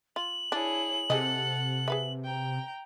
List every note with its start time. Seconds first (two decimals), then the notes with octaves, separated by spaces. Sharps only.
0.16 F4 F#7
0.52 D4 E4 G#4 C#5
1.10 C3 G#4 A4 D#5 F#5
1.88 G#4 B4 E5
2.25 G5 A#5